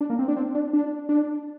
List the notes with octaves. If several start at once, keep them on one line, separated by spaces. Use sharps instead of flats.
D4
A#3
C4
D4
C4
D4
D4
D4